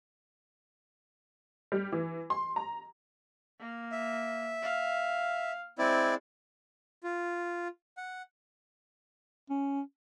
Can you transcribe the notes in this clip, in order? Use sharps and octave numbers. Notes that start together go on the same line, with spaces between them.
G3
E3
C6
A#5
A#3
E5
F5
G#3 C4 E4 D5
F4
F#5
C#4